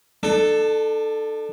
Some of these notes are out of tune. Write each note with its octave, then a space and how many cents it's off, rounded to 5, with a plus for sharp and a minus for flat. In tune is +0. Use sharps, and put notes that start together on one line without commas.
D4 +35 A4 +0